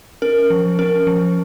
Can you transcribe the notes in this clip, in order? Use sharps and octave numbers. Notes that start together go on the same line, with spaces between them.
C#4 A#4
F3
C#4 A#4
F3